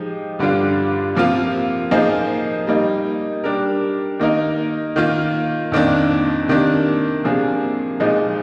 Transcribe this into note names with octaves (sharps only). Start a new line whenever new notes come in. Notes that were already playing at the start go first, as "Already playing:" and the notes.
Already playing: F3 G#3 D#4 G4
G2 D3 G3 D4 F4
C3 F3 A#3 F4
F3 A#3 D#4 G#4 C5
G3 A#3 D#4
G3 D4 G4 A#4
D#3 A#3 D#4 A#4
D#3 A#3 F4
F2 D#3 A#3 D4
C3 D#3 A#3 D4
C3 F3 A#3 D4 G#4
A#2 F3 G#3 D#4